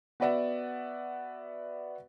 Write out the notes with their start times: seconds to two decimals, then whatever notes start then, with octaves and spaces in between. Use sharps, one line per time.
0.20 B3 F#4 B4 D5 E5 F#5